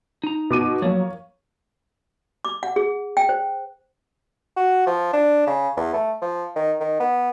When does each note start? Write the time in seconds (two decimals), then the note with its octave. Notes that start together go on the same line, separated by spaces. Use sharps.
0.24 D#4 A#5
0.50 B2 D6 D#7
0.82 F3 F#3 A#3 C#5
2.45 D6
2.63 F#5
2.76 G#4
3.17 G5
3.29 C5
4.57 F#4
4.87 F3
5.13 D4
5.47 C#3
5.77 E2
5.94 A3
6.22 F3
6.56 D#3
6.80 D#3
7.00 B3